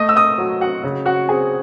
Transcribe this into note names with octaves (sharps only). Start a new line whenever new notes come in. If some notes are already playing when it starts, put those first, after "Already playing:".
Already playing: A3 D#5 D#6
E6
D#5 D#6
F#3
F#4 F#5
C#3
F#4 F#5
C4 G#4 G#5